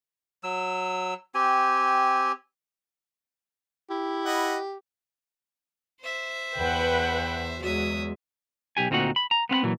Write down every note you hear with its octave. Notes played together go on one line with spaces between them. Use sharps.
F#3 E6
C4 G4 G#5
E4 G4
D#5 F#5 B5
C5 E5
E2 B4 F#5 G5
E2 F#3 G#3 E5 D#6
B1 G4 G#5
D2 A#2 C4 D#4 F#4 F#5
B5
A#5
B3 C4 F5 B5
A#2 E3 F#3